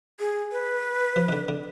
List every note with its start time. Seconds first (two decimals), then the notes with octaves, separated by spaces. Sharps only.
0.20 G#4
0.52 B4
1.16 F3
1.28 D#3
1.32 D3
1.48 D3